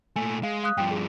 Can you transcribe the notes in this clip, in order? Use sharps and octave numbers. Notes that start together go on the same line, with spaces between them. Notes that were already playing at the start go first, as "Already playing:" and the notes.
A#2 A3 G#5
G#3 F5
F5 D#6 F#6
G2 F3 G5
G#4